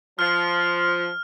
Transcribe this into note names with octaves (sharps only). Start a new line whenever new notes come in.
F3 F6